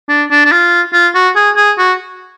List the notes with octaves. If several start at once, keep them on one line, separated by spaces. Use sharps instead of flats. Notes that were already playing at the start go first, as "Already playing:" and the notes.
D4
D4
D4
F4
F4
F#4
G#4
G#4
F#4